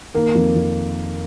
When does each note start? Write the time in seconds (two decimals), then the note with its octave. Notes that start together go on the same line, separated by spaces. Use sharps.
0.14 D#3 A#3 A#4
0.35 F2
0.56 F2